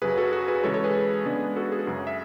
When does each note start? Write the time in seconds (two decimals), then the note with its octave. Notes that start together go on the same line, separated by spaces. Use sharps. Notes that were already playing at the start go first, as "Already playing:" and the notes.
0.02 F#2 C#3 F#3 G#4 B4
0.17 F#4 A4
0.33 F#4 A4
0.48 G#4 B4
0.64 C#3 E3 G#3 A4 C#5
0.74 A4 C#5
0.84 G#4 B4
1.26 C#3 G#3 B3 D4
1.56 F#4 A4
1.72 G#4
1.87 F#2 C#3 F#3
2.07 E5